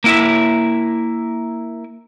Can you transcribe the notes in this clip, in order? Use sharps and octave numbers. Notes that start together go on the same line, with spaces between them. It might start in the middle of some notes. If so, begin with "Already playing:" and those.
A#3 E4 E5